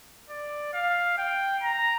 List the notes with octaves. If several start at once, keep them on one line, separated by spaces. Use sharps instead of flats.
D5
F5
G5
A#5